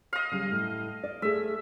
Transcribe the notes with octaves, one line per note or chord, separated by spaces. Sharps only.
D#5 F5
C#3 F#3 G3
A2
D5
A3 G#4 E5